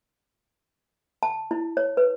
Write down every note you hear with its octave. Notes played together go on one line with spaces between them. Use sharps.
A5
E4
C#5
B4